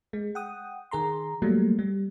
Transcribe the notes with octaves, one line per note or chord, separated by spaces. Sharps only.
G#3
F#5 G5 D#6
D#3 G#4 A#5 C6
F#3 G3 A3 A#3
G3